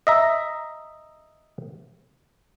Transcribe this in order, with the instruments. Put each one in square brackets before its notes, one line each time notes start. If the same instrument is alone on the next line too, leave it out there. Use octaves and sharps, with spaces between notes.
[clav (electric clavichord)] D#5 E5 A#5